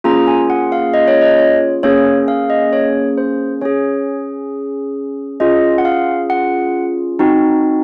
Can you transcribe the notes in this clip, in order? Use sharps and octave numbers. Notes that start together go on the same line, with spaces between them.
A#3 C#4 F4 G#4 A#5
G#5
F#5
F5
D#5
C#5
D#5
C#5
A#3 C#4 G#4 C#5
F5
D#5
C#5
C5
C#4 G#4 C#5
C#4 F4 G#4 D#5
F#5
F5
F#5
C4 D#4 F#4